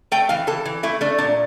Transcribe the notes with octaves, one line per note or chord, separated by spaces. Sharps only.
A3 G5
E3 F5
E3 A4
E3
A3 E4
A3 D4
A#2 D4